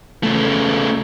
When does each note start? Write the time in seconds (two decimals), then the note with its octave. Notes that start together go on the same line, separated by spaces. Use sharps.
0.23 C#3 A3